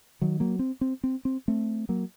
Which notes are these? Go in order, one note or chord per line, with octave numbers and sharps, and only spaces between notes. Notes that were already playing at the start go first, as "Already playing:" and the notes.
D#3 F#3
F#3 A#3
C4
C4
C4
C4
A3 C4
F#3 A#3